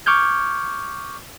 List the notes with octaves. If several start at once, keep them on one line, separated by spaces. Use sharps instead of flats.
C#6 D6 F6 G6 G#6